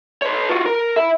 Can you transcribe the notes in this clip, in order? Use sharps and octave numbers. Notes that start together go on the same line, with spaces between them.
B4 C#5
F4 F#4
A#4
E4 E5